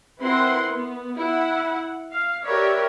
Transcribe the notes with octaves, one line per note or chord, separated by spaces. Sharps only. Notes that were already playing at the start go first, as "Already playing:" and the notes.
C4 E4 A#4 B4 F#5 C6
B3
E4 F#5
F5
G4 A#4 B4 C#5 D5 E5